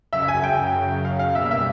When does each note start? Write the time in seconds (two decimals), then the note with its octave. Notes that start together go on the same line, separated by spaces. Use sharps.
0.13 F#2 C#3 F#3 E5
0.28 G#5
0.44 G5
1.05 F5
1.19 F5
1.35 B2 G3 A#3 E5
1.51 E5